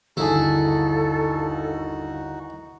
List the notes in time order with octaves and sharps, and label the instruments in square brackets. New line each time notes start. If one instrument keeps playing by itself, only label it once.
[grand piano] G1 D#2 [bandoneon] D#4 F#4 [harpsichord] E4 G#4 [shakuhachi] A4